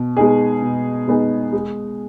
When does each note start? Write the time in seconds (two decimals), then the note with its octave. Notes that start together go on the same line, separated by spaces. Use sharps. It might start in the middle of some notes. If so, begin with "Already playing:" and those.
Already playing: B2
0.17 G#3 B3 D#4 G#4
0.62 B2
1.08 G#3 B3 D#4 G#4
1.53 G#3